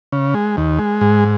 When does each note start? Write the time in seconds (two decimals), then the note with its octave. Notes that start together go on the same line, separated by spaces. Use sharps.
0.12 C#3
0.34 G#3
0.57 D#2
0.79 G#3
1.01 G#2